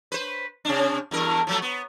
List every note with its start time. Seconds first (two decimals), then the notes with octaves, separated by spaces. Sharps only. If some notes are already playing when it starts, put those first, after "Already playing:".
0.12 B4 C5
0.65 C3 C#4 D4
1.11 E2 G2 A#4
1.47 F3 F#3 A3
1.62 B3